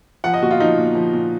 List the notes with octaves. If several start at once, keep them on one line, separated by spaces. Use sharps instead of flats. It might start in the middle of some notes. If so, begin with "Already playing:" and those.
F3 F#5
D#5
A#2 F#4
F4
F3 D#4
A#2
F3
A#2